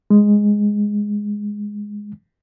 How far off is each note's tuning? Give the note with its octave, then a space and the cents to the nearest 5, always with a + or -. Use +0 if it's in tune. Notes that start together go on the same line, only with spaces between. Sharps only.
G#3 -5